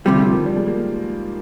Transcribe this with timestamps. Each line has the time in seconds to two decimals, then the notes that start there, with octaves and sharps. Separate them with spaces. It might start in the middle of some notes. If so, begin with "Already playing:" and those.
0.05 D2 C3 F3 G3
0.19 F3
0.33 D#3
0.46 G3
0.56 G#3
0.66 A#3